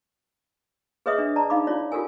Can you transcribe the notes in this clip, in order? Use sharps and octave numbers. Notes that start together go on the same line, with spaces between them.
G#4 B4 C#5 D#5 E5 D#6
D4
D5 A5 A#5
D#4 F5 B5 D6
C#4 E4 F4 C#5 D5
F4 G4 A4 A#4 G#5